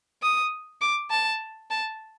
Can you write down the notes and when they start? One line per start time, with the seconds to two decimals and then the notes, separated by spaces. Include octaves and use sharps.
0.22 D#6
0.81 D6
1.10 A5
1.71 A5